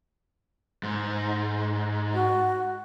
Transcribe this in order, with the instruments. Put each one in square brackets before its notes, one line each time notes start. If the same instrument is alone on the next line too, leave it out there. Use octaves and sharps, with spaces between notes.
[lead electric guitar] G#2
[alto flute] F#4